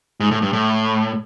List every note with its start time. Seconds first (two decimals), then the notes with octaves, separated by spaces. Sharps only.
0.20 G#2
0.31 A2
0.42 G2
0.53 A2